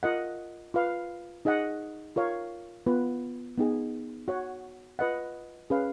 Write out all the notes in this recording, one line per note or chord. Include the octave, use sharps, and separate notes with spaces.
F4 A#4 D#5 F#5
F4 B4 F5
D#4 G#4 D#5 F#5
F4 A#4 C#5 F5
B3 F4 B4
B3 D#4 G#4
F#4 C#5 F#5
F4 B4 D#5 F#5
C#4 G#4 B4 F5